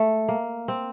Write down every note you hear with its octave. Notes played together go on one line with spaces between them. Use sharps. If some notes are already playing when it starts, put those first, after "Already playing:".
Already playing: A3
A#3
C4